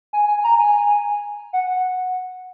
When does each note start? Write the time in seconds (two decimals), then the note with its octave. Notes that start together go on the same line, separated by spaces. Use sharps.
0.13 G#5
0.28 G#5
0.44 A#5
0.59 G#5
1.53 F#5